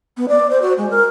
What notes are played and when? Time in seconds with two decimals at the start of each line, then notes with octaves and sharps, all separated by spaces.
0.17 B3
0.29 D5
0.50 C5
0.62 F#4
0.78 G#3
0.90 A#4